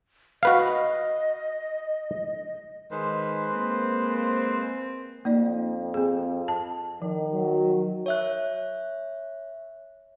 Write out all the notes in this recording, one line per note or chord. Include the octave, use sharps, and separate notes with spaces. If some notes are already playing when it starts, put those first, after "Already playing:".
F#4 B4 D#5 F5
D#3 G#3 B4 C5
A#3 C4
F2 A#3 D#4 D5
C4 G#4
A5
D#3 F3
F#3
C#5 E5 F#6